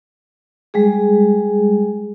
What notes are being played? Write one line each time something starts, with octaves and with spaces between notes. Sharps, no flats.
G3 G#3 G#4